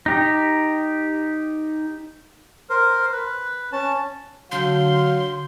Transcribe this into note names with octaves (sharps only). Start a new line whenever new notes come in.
D#4 G4
A#4 C5
B4
C#4 A5
D3 F#3 F5 C6 G6